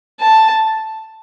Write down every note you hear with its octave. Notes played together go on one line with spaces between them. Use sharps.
A5